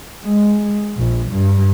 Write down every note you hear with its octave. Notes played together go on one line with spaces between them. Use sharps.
G#3
A#1
G2